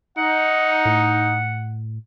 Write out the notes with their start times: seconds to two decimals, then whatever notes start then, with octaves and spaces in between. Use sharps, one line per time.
0.17 D#4 F#5
0.85 A2